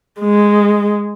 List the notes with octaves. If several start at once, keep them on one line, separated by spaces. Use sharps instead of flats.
G#3